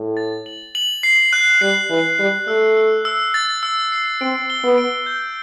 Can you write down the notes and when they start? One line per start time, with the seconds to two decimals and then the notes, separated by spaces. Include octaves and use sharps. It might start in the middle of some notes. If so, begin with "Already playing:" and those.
Already playing: A2
0.17 A6
0.46 F#7
0.75 F#7
1.03 C7
1.33 F#6
1.61 G3 C7
1.89 E3 F#7
2.19 G3 F#7
2.47 A3 E6
2.77 E6
3.05 E6
3.34 A6
3.63 E6
3.92 C7
4.21 C4 D7
4.50 G7
4.63 B3
4.78 D7
5.06 G6